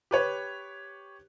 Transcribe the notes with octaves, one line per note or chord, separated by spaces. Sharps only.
G4 B4 C#5